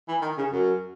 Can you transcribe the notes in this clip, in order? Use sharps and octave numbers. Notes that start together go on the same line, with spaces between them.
E3
D#3
C#3
F#2